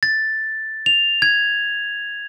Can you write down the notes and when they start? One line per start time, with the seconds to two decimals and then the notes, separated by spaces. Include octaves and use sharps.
0.03 A6
0.86 F7
1.22 G#6